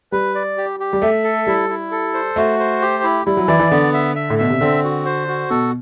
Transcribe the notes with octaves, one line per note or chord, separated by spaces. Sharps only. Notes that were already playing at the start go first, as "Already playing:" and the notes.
G3 B4
D5
G4
G4
G3
A3 E5
A4
G3 E4
E4
A4
C5
A3 F#4
C5
G4
E4
G3 E4
F#3
E3 D5
E3
D3 B3
E5
E5
A2
B2 E5
C3
D3 C4
F#4
C5
F#4
B2 A4